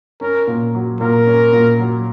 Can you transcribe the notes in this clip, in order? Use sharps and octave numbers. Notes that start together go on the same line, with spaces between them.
C#4 A#4
A#2
F#3
A#2 A#4
C#4
A#2
F#3